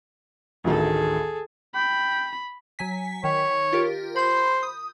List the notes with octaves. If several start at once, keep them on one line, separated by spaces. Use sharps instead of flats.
A1 D2 D#3 G#4 A4
G5 B5
F#3 G#5 B6
D#3 C#5
F4 G4 A#4
C5 B5 G6
D#6